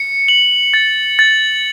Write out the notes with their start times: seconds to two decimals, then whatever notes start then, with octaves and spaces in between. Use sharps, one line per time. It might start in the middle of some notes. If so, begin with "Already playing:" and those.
Already playing: C#7
0.28 F#7
0.74 A6
1.19 A6